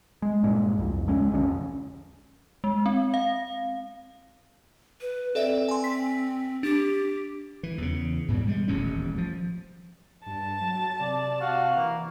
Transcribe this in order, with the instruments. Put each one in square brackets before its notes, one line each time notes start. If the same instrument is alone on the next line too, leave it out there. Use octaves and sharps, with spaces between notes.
[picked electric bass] G#3
G2 A#2 G#3
C2 F2
D1 C#2 G#3 C#4
B1 F2 D3 C#4
[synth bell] G#3
C4
F5
[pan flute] B4
[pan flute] C4 [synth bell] A4 D5 E5
[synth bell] G#5 C6
B6
[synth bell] D4 [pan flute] G4
[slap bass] E3
E2 C#3
G#2 B2 E3 G3
G3 G#3
D#1 A1 E2 C#4
F3
[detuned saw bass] G2 [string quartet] A5
[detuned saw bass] F#3
[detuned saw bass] C3 [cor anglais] D5
[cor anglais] F#4 [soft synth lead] F5
[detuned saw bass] E3 [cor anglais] A#3